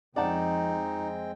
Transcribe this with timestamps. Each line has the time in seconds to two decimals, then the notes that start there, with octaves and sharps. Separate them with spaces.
0.16 F2 G#3 C4 D#4 D5 F#5 G5 A5